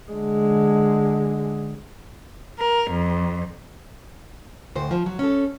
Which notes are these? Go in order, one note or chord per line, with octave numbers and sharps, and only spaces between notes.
D3 G#3
A#4
F2
D2 A2 C5
F3
F#3
C#4 A4